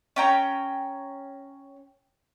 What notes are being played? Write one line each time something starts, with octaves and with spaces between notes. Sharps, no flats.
C#4 G5 A#5